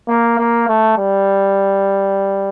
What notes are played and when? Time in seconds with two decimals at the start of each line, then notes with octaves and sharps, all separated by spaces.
0.08 A#3
0.39 A#3
0.68 A3
0.98 G3